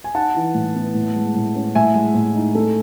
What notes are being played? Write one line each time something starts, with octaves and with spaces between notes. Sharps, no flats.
G#5
D#4 F#5 A5
E3
A2
B3
A2
G#3
A2
C#4
A2 E5 G#5
G#3
A2
D#4
A3